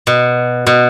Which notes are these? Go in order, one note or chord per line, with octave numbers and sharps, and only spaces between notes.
B2
B2